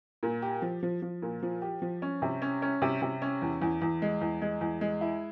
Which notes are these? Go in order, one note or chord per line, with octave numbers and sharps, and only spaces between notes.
A#2
G4
F3
F3
F3
A#2
F3
G4
F3
C#4
C3
C#4
C#4
C3
C3
C#4
E2
E2
E2
G#3
E2
G#3
E2
G#3
E4